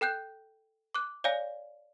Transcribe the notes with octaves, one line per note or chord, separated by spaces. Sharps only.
A4 G5 F#6 G6
D6 F#6
C#5 D5 F5 G#5